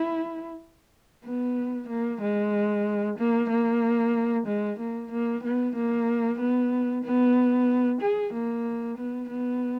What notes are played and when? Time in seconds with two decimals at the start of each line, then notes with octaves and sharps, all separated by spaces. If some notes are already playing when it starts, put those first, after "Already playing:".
Already playing: E4
1.25 B3
1.88 A#3
2.21 G#3
3.18 A#3
3.50 A#3
4.47 G#3
4.79 A#3
5.11 A#3
5.43 B3
5.75 A#3
6.39 B3
7.04 B3
8.01 G#4
8.33 A#3
8.97 B3
9.29 B3